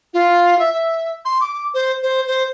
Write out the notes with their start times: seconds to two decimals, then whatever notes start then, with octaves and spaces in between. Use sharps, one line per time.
0.14 F4
0.59 E5
0.73 E5
1.25 C6
1.41 D6
1.74 C5
2.03 C5
2.27 C5